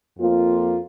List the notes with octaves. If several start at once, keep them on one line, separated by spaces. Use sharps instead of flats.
F2 A#3 F4